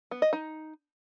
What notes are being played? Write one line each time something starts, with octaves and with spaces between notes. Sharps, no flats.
B3
D#5
D#4